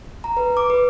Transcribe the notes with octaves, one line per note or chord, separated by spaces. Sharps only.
A#5
B4
D6
B4